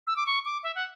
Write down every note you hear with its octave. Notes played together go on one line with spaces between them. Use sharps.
E6
D6
C#6
D6
E5
F#5